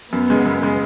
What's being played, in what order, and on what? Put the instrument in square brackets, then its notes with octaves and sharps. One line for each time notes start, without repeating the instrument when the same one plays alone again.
[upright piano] F#2 [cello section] B3
[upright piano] C#3 G#3
F#2
C#3 G#3